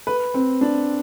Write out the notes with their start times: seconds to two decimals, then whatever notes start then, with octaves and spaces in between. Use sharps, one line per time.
0.07 B4
0.34 C4
0.61 D4